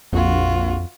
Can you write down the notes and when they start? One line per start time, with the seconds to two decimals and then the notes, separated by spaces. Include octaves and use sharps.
0.13 A#1 F2 F4 F#4